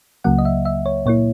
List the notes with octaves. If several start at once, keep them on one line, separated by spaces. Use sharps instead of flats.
C#2 C#3 F#3 A#3 F#5
D#5
E5
E5
C#5
A#2 A#3 E4 C#5